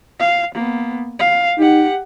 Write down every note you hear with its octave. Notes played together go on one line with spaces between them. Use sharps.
F5
A#3 B3
F5
D#4 G4 F#5